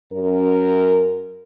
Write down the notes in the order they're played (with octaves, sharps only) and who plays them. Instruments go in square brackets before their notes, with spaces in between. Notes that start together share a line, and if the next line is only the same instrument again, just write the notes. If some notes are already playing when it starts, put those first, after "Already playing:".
[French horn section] F#2 A#4